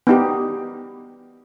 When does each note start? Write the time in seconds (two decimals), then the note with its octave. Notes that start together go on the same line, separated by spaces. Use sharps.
0.07 B3 D#4 G4